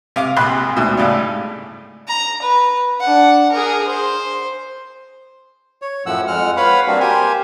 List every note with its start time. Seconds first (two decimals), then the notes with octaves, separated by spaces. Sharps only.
0.16 C3 F5 D6
0.37 A#1 C3 B5 C6 F#6
0.76 D2 G#2 B2
0.97 G#1 A2 C#3 G3
2.08 A#5
2.42 B4
3.00 D4 F#5
3.51 G#4 A#4
3.88 C5
5.82 C#5
6.06 F#2 A2 F3 F#5 E6
6.27 F2 G#3 F#5 F6
6.57 B4 C#5 F5 F#5 B5
6.87 G3 A#3 C4 D4 F#4
7.00 G4 A#4 C5 G#5